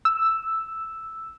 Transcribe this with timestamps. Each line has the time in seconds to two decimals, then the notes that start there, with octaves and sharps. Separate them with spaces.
0.05 E6